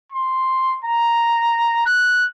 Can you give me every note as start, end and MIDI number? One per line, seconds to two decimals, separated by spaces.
0.12 0.77 84
0.85 1.81 82
1.86 2.26 90